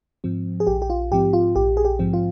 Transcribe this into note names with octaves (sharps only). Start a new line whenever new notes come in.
G#2 F3 C4
G#4
A#1 G4
G4
F4
G#2 F3 C4 G4
F4
A#1 G4
G#4
G4
G#2 F3 C4
F4